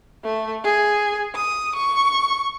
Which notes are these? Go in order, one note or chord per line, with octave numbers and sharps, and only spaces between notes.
A3
G#4
D#6
C#6